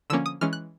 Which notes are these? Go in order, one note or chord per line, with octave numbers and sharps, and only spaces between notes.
D3 F3 A#3 C#4 E6
D#6
E3 G#3 C#4 F6
F#6